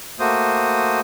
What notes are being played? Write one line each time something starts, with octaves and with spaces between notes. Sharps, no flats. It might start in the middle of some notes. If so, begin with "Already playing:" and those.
A3 A#3 F#4 C5 D#6